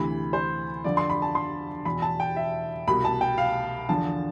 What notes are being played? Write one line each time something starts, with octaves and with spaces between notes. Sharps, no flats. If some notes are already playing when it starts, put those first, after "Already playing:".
Already playing: D2 C3 E3 B5
C5
F2 D3 F3 D5
C6
B5
A5
C6
E2 B2 B5
A5
G5
E5
C2 B2 B5
A5
G5
F5
E2 D3 F3 A5